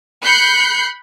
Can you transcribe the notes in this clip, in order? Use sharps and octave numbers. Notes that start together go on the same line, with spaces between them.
B5 F#6 G6 C7 C#7